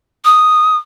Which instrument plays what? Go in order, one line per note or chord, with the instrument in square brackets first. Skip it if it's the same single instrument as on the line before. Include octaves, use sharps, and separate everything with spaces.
[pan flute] D#6